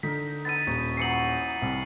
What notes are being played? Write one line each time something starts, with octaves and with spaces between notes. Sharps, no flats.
D3 D#4 A#4 B6
B3 D#4 A4 A6 D#7
D#1 C#5
E3 F#3 D#4 C7 C#7 F#7
C2